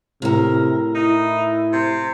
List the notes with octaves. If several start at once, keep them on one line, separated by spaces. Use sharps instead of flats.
A2 C3 A#4
D#4 E4
C3